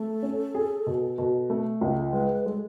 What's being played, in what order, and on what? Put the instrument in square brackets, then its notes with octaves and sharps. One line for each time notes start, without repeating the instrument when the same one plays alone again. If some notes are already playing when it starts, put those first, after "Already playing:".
Already playing: [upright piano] A3 [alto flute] A4
[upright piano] C#4
G#4
B2
B2
A3
C#2
[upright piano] G#3 [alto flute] B4
[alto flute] B4
[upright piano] G#3 [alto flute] A4